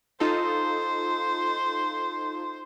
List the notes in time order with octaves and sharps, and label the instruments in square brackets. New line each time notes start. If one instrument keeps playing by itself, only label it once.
[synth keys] D#4 F4 A4 [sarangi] C5